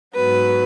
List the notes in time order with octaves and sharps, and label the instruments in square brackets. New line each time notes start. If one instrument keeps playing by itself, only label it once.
[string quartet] G#2 F#3 B3 B4